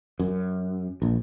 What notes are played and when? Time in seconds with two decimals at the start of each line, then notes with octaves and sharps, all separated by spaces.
0.19 F#2
1.02 A#1